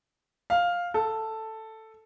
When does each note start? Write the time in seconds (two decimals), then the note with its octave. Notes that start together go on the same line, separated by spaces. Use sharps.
0.50 F5
0.94 A4